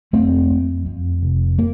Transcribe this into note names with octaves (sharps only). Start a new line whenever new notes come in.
F2 A3 C4
F2
F2
F1
A#3